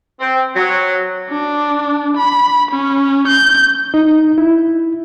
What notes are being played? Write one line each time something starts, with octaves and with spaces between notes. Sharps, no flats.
C4
F#3
D4
B5
C#4
G6
D#4
E4